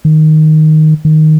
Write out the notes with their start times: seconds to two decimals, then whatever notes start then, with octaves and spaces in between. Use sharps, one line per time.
0.05 D#3
1.05 D#3